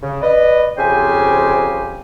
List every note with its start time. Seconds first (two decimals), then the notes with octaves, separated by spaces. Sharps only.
0.03 C#3
0.22 B4 D5 D#5
0.77 F2 C#3 G4 C5 G5 G#5